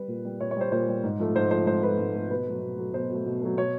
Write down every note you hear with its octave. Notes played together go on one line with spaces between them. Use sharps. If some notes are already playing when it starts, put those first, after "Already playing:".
Already playing: G3 B4
A#2
G3
A#2 C#5
C#5
G3 C5
A#2 C5
G3
G#2
F3 A3
G#2 C5
F3 A3 C5
G#2 C5
F3 A3 B4
G#2
F3 A3
B2 B4
F#3 A3
B2
F#3 A3
B2 C5
F#3 A3
B2
F#3 A3
B2 C#5